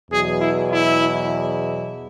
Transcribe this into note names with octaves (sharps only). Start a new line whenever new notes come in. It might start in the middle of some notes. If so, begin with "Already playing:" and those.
E2 B2 F#3 G#4
E4
E4